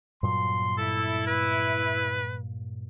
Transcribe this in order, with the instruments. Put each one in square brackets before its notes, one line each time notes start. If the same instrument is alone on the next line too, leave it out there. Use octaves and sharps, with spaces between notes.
[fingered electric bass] G2 A#2 F#3 [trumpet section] C6
[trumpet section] E4 [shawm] A4
[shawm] B4